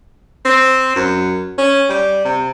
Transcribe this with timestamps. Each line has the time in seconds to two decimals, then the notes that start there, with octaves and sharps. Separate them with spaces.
0.45 C4
0.95 F#2
1.58 C#4
1.89 G3
2.25 C3